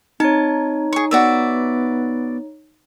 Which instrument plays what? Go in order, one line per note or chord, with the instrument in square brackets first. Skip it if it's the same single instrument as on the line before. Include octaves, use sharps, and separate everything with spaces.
[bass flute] C4 [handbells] D#4 C#5 [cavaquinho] A5
[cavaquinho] G#4 C#6
[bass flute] B3 [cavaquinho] F#4 D5 E5